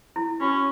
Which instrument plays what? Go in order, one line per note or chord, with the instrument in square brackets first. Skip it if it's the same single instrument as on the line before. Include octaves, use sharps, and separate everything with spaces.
[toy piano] E4
[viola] C#4 [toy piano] F#4